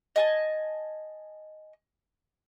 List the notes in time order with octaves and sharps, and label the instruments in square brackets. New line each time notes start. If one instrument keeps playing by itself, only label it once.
[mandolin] D#5 G#5 A5